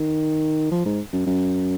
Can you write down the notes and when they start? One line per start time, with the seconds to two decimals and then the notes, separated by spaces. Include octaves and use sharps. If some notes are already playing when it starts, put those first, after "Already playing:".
Already playing: D#3
0.72 F3
0.85 G#2
1.13 F#2
1.27 F#2